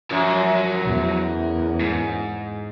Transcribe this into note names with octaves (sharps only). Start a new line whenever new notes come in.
F#2 F3 F#3
E2
G#2